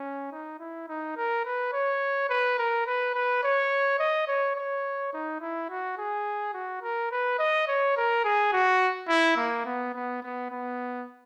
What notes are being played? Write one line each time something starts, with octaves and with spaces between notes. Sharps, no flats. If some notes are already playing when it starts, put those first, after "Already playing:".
Already playing: C#4
D#4
E4
D#4
A#4
B4
C#5
B4
A#4
B4
B4
C#5
D#5
C#5
C#5
D#4
E4
F#4
G#4
F#4
A#4
B4
D#5
C#5
A#4
G#4
F#4
E4
A#3
B3
B3
B3
B3